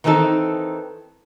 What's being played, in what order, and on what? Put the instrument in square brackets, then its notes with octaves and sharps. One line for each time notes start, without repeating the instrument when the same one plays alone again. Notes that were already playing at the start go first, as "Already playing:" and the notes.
[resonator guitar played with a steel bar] D#3 E3 C4 D#4 A4